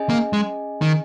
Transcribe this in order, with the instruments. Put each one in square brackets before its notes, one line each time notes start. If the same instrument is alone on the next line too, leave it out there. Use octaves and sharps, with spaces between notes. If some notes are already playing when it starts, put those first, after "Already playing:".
Already playing: [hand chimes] C#4 G#4 D#5 G#5
[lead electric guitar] A#3
G#3
D#3